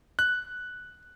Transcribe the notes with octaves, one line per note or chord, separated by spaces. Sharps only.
F#6